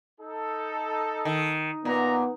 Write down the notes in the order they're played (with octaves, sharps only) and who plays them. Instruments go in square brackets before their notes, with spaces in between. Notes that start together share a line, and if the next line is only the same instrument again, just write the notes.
[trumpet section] D#4 A4
[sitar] D#3
[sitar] A#2 [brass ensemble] B3 [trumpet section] D#5 F#5 A#5